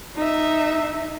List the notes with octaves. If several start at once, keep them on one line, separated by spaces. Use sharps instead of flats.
D#4 E5